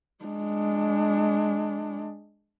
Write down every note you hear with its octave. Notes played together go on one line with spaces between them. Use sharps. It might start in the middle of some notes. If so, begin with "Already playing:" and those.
G#3 D4